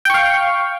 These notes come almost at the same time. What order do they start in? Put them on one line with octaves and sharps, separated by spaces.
G5 C#6 F5